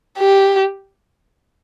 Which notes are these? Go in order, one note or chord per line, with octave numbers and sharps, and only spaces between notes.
G4